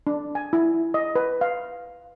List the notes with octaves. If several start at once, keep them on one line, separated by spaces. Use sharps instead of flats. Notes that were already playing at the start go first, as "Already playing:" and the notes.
D4
G#5
E4
D#5
B4
F5